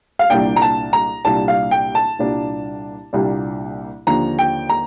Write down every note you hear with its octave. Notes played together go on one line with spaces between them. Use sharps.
F5
C2 A#2 G3 A#3 D4 G5
A#5
A5
A#5
C2 A#2 G3 A#3 D4 A5
F5
G5
A5
C2 A#2 G3 A#3 D4
C2 A#2 G3 A#3 D4
D#2 D3 F3 A#3 D4 A#5
G5
A#5